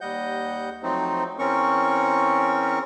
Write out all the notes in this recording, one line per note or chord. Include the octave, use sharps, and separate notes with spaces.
D#2 G3 D#5 F#5 G6
F3 F#3 A3 C4 D#4
E2 C4 C#4 A#4 C#6